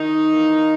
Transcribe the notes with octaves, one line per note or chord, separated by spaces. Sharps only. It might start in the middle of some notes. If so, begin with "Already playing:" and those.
Already playing: D#3 D#4
E3 A#3